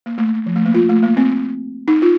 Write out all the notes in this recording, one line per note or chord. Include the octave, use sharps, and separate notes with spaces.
A#3
A3
F3
A3
A#3
F4
A3
A#3
C4
D#4
F4